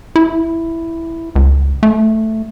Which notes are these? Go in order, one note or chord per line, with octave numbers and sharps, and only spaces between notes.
E4
C#2
A3